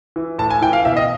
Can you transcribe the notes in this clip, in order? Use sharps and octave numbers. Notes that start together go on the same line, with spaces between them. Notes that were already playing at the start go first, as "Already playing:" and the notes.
E3
A2 A5
G#5
E3 G5
F5
B2 E5
D#5